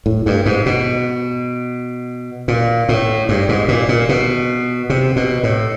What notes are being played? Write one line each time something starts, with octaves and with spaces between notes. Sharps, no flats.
A2
G2
G#2
B2
A#2
A2
G2
G#2
A#2
A#2
B2
C3
B2
A2